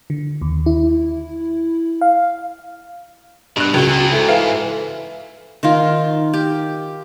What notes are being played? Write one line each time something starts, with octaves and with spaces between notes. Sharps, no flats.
D3
D#2
E4
F5
G2 B2 F#6
C#2 F#3 F#4
E3 G#4
G#2 E4 A4
E3 F5
D#3 F4
G4